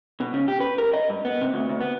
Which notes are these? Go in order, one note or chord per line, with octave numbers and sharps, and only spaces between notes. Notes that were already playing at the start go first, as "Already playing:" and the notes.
B2
C#3
G4
B4
A#4
D#5
G2
B3
C3
D2
D2
B3